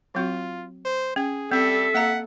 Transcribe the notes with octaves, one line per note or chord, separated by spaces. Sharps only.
F#3 C4 F4 F#4
C5
C#4 G#4
G3 C4 A4 E5
A#3 F5 F#5 A#5